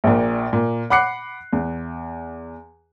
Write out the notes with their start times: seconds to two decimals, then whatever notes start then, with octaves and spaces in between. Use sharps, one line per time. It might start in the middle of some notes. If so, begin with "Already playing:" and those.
0.04 A#1 A#2
0.53 A#2
0.90 F#5 B5 D6 F#6 C7 C#7
1.53 E2